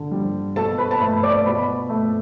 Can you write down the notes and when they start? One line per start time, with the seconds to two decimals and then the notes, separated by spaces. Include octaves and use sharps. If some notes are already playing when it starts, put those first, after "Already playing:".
Already playing: D3
0.11 G3
0.56 B2 A4 A5
0.78 B4 B5
0.91 A5
1.00 A3 B4 B5
1.23 D5 D6
1.45 B2 B4 B5
1.89 A3